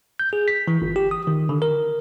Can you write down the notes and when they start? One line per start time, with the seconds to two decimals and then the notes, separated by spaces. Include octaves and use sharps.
0.19 G6
0.33 G#4
0.48 B6
0.68 E3
0.82 G1
0.96 G4
1.11 D#6
1.27 D#3
1.49 D3
1.62 A#4